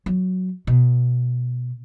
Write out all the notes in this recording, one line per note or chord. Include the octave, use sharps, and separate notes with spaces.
F#3
B2